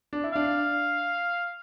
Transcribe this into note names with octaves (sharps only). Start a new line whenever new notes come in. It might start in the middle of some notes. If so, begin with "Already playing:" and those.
D4
E4
D4 F5